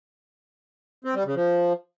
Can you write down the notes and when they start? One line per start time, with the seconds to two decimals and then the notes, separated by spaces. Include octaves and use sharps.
1.05 C4
1.15 G3
1.25 C#3
1.35 F3